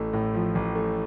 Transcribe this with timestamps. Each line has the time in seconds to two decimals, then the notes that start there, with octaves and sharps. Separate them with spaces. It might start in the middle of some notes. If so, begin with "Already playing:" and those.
Already playing: A1 A3
0.13 A2
0.34 F3
0.55 A1
0.75 A3